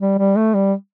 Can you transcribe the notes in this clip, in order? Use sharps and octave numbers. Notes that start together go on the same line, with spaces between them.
G3
G3
A3
G3